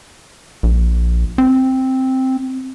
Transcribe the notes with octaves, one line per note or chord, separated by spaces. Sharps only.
A#1
C4